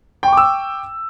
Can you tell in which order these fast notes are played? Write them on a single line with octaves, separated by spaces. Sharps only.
G5 C#6 D6 E6